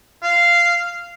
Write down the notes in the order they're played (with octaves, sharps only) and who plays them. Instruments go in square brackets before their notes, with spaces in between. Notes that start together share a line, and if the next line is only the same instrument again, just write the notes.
[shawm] F5